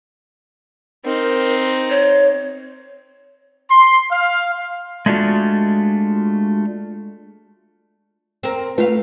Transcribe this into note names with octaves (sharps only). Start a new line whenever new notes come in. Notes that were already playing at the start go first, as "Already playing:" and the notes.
C4 D#4 A#4
C#5
C6
F5
G#3 A3 D4 F4 F#4
C4 A#4
A3 F4 B4 F5